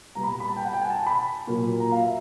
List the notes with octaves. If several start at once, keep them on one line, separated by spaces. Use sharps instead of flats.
A#2 G3 B3 A#5
B5
B5
A5
G5
F#5
G5
G#5
A5
B5
A#2 F#3 A#3
A#5
F5
E5